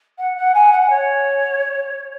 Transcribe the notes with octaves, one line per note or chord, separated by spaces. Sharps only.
F#5
F#5
G#5
F#5
C#5